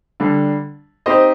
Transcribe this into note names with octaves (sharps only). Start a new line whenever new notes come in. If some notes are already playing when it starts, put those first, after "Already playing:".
D3 G3 D4
C4 D#4 G4 C5 D#5